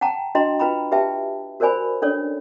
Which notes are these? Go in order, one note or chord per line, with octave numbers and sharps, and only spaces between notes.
F#5 G5 A5 A#5
D4 F#4 D#5 G5 A#5 C6
F4 B4 G5 A#5 B5
G4 B4 E5 G5 A5
F#4 A#4 C5 D5 G#5 B5
C#4 D4 A4 C#5 D5